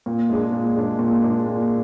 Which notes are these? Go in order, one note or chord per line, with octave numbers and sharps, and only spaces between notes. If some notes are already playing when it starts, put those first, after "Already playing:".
A#2
G#3 D4 G#4
A#2
G#3 D4 G#4
A#2
G#3 D4 G#4
A#2